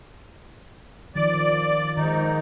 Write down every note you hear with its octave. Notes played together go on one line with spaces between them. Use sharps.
D#3 F3 D5
G#2 D#3 D#4